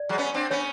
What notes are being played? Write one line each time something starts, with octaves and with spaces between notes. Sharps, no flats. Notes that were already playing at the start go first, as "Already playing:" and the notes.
Already playing: D5
F#3 G#3
B3 C#4
C4 D4
B3 C#4 C#5